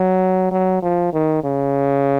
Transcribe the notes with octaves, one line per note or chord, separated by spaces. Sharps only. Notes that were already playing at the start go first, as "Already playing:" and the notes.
Already playing: F#3
F#3
F3
D#3
C#3